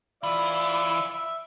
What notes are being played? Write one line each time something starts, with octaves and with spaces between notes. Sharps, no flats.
E3 F4 D5 E5
E5